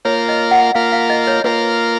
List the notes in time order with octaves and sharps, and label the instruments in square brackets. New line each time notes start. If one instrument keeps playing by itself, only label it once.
[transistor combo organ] A#3 F4 A#4 [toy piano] C#5
[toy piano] D#5
F#5
[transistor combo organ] A#3 F4 A#4 [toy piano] F5
[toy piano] F5
D#5
C#5
[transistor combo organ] A#3 F4 A#4 [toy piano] B4